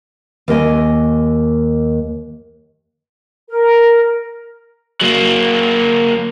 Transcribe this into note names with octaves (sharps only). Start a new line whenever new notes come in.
D#2 A#4 D#5 G#5
A#4
F#3 A#3